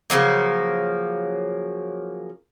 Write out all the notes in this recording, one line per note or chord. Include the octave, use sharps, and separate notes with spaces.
C#3 F3 F#3 A#3